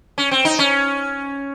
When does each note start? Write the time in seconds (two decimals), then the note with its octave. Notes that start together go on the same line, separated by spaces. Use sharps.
0.18 C#4
0.31 C4
0.45 D#4
0.59 C#4